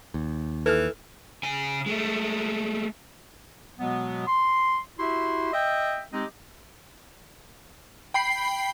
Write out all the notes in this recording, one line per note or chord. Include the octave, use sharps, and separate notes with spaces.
D#2
E3 A4 F6
C#3 G#5
G#3 A3
B2 F#3 G#3 B3
C6
E4 F#4 G4 E5 C6
D#5 E5 G5
G#3 C4 D#4 G4 D#5
G5 B5 C7